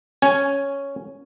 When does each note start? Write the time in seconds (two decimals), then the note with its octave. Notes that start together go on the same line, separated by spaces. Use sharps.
0.22 C#4 G#5